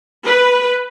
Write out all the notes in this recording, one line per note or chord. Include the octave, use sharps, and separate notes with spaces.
B4